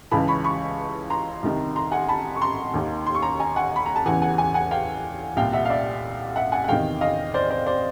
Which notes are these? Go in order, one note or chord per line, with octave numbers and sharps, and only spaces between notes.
C#2 C#3 E3 A5 B5
B5 C#6
B5 C#6
A#5 C6
C2 C3 D#3
A#5 C6
F#5 G#5
A5 B5
C#6
A#5 C6
D#2 D#3
C6
C#6
A#5 C6
G#5 A#5
F#5 G#5
B5
A#5
A5
E2 C#3 E3 F#5 G#5
F#5 G#5
F#5 G#5
F#5 G#5
F5 G5
C2 A#2 F5 G5
E5 F#5
F5
D5 E5
E5 F#5
F#5 G#5
F#5
E2 C3 D#3 F5 G5
D#5 F5
C5 D5
C5 D5
C5 D5